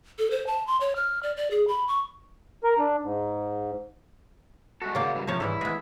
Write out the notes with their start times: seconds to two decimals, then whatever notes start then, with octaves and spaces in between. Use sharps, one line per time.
0.19 A4
0.31 C5
0.47 A5
0.67 C6
0.81 C#5
0.96 F6
1.23 D5
1.37 D5
1.51 G#4
1.68 B5
1.88 C#6
2.64 A#4
2.78 D4
3.03 G#2
4.82 G#3 A3 F#4 A4
4.95 C#3 F#3 A#3 C5 D5
5.15 G#2 E3 G3
5.27 C3 F3 C#5 A5
5.40 G#2 E3 G3 E4 A4
5.61 G#3 B3 G#4